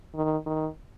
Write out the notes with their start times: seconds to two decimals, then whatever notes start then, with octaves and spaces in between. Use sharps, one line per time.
0.15 D#3
0.46 D#3